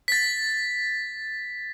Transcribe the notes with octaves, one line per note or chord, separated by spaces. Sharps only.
A6 B6